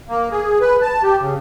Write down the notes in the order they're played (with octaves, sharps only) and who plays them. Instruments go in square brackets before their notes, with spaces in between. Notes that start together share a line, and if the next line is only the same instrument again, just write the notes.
[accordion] A#3
G#4
B4
A5
G4
C#3